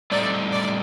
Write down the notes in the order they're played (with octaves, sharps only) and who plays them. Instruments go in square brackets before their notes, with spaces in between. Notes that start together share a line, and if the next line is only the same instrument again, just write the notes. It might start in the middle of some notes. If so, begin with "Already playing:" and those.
[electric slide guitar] A2 G3 C4 D#4 A4 [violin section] D5
[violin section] D5